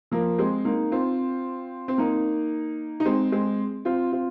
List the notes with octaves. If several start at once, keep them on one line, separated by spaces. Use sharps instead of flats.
F3 A#3
G#3 C4
A#3 D#4
C4 F4
C4
A#3 D#4
D#4
G#3 C4
G#3 C4
C4 F4
C4 F4